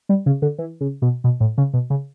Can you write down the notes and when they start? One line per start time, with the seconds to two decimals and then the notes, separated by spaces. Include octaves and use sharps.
0.09 G3
0.26 C#3
0.42 D3
0.58 E3
0.81 C#3
1.02 B2
1.24 B2
1.40 A2
1.58 C#3
1.74 B2
1.90 C#3